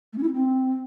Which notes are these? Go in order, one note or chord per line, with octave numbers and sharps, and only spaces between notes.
A3
C#4
E4
C#4
C4